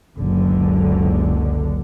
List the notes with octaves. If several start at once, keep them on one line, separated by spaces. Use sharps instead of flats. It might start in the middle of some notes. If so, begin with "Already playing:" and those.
F#1 C#2 D3